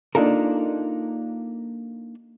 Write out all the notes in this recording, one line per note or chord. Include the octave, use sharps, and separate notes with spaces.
A#3 D4 D#4 F4 A4 A#4